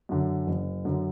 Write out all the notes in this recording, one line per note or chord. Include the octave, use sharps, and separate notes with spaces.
F#2 D3
F#1
F#2 D3